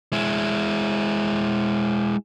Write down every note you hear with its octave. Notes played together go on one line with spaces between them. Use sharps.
G#3 E4